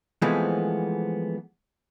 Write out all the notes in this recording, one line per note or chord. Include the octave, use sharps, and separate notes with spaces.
E3 F3 G#3 A3 B3 C4